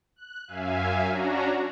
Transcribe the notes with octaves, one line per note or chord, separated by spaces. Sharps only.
F#6
F#2 E5 F5 G#5
C#4 D4 F#4 A#5